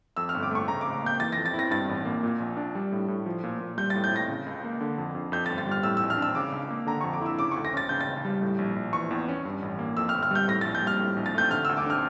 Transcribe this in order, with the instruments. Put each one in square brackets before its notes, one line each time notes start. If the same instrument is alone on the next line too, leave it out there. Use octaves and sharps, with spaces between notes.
[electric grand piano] F2 [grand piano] E6
[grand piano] F6
[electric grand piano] G1
[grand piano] D6
[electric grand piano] A3 [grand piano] C#6
[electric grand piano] C#3 [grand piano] A#5
[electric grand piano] C#2 [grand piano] D6
[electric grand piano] A#3 [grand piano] G6
[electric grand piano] E3 [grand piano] A6
[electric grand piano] F2 [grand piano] A#6
[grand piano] A6
[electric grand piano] E4
[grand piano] A#6
[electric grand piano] G2 [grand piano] A6
[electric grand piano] A1
A#3
A#2
A#1
D4
G3
A2
A2
F3
A#2
A#2
[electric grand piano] G3 [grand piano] G6
[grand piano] A6
[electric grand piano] A2
[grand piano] G6
[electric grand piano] A2 [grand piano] A#6
[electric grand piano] C#3
C#2
A#3
D3
F2
F2
[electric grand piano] F2 [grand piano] G6
[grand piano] A6
[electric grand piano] G1
[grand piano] A6
[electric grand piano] G3
[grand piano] F6
[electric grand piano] A2 [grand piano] E6
[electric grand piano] A#1 [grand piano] E6
[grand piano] F6
[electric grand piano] D4 [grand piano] E6
[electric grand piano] C#3 [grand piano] D6
[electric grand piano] C#2
A#3
[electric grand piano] D3 [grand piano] A#5
[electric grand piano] F2 [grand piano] C#6
[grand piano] D6
[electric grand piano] E4 [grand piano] E6
[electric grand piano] C#3 [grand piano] D6
[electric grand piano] D2 [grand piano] C#6
[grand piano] A#6
[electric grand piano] C#4 [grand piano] A6
[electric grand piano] C#3 [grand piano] G6
[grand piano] A6
[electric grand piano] C#2
G3
A2
A#1
A#1
[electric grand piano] E3 [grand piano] C#6
[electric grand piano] E2
C#4
G2
A1
A#3
[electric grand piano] F2 [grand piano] E6
[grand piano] F6
[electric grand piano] G1
[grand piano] F6
[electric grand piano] G3 [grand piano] G6
[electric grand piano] A2 [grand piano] A#6
[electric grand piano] A#1 [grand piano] A6
[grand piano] G6
[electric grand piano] G3 [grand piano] F6
[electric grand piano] A2
A#1
[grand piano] A6
[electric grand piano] A3 [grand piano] G6
[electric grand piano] D3 [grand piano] F6
[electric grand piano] D2 [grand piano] E6
[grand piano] D6
[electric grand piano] D4 [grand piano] F6